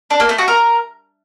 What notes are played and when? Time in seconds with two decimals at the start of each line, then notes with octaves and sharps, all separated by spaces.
0.10 D4
0.20 A#3
0.29 A3
0.38 F#4
0.48 A#4